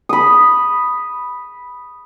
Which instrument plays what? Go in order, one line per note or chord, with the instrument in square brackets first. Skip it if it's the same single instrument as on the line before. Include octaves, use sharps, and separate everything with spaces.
[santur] B5 D#6